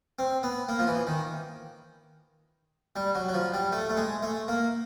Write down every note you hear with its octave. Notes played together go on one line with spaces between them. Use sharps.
C4
B3
A#3
F3
E3
D#3
G3
F#3
F#3
F3
G3
A3
A3
G#3
A3
A#3